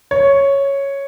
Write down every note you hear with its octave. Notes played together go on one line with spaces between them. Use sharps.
C#5